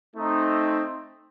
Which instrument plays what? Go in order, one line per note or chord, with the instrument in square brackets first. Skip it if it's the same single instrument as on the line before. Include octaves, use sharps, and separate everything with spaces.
[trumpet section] A3 C4 D#4